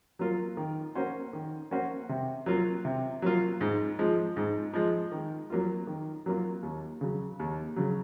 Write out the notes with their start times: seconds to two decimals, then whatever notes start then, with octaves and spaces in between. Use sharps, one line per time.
0.19 F#3 A#3 F4 A#4
0.57 D#3
0.95 A#3 C#4 F#4 C5
1.33 D#3
1.71 A#3 C#4 F#4 C5
2.09 C3
2.46 F#3 A#3 F4
2.85 C3
3.22 F#3 A#3 F4
3.61 G#2
3.99 F3 G#3
4.37 G#2
4.73 F3 G#3
5.12 D#3
5.50 F#3 A#3 F4
5.87 D#3
6.26 F#3 A#3 F4
6.63 D#2
7.01 C#3 F#3
7.39 D#2
7.76 C#3 F#3